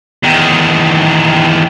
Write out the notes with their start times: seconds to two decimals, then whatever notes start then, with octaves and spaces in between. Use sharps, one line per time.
0.23 E2 D#3